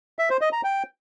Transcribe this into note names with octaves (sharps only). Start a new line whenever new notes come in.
E5
C5
D#5
A#5
G5